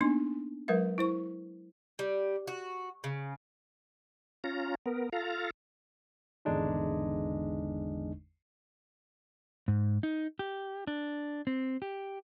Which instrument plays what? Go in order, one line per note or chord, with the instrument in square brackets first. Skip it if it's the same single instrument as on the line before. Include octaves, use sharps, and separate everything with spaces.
[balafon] A#3 B3 D4 D#4 C6
F#3 G#3 A#4 B4 E5
E4 C5 C#6
[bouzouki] G3
F#4
C#3
[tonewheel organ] C#4 F4 A#5
B3 A#4
F4 A4 F5 A#5
[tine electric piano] G#1 E2 D3 G#3 D4 D#4
[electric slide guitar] G#2
D#4
G4
D4
C4
G4